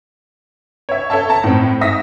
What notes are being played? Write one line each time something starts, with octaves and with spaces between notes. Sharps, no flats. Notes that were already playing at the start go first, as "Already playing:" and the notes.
C#5 E5
A4 C#5 E5 A5
A5 A#5
A2 C4
G#2 E5 D#6 A#6 B6